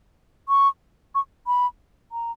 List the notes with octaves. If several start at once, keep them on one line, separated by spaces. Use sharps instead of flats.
C#6
C#6
B5
A#5